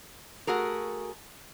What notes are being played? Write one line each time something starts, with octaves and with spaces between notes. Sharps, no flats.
A3 F#4 G#4 A#4